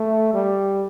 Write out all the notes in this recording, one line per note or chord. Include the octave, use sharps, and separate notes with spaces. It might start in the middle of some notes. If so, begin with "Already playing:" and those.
Already playing: A3
G3